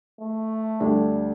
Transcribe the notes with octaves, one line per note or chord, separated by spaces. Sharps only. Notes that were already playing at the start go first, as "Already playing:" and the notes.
A3
D2 G3 D4